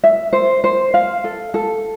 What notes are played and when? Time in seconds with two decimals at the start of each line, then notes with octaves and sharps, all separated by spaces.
0.04 E5
0.33 C5
0.64 C5
0.94 F5
1.24 A4
1.54 A4